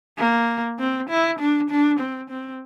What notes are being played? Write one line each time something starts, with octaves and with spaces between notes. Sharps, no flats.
A#3
C4
E4
D4
D4
C4
C4